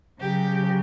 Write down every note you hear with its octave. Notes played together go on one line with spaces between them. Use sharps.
C#3 F#3 G4